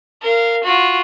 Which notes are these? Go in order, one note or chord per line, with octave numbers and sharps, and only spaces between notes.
A#4 F5
F4 F#4